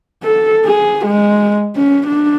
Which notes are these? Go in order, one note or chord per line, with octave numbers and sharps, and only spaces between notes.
A4
G#4
G#3
C#4
D4